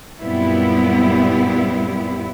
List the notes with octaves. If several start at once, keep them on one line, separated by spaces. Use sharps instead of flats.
F#2 A#2 G3 B3 C4 E4